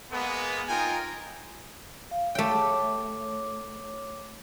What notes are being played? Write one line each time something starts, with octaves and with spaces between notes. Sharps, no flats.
G#3 A#3 B3
D#4 F4 A#4 G5 G#5
F5
A3 C#5 G5 D6